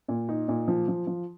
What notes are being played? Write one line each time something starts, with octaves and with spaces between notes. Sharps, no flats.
A#2
D#4
A#2
F3
F3
F3